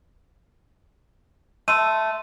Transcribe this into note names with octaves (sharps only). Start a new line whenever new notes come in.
A3 C6 E6 D#7